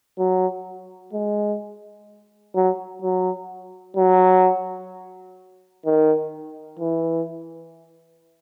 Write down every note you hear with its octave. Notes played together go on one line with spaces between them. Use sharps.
F#3
G#3
F#3
F#3
F#3
D#3
E3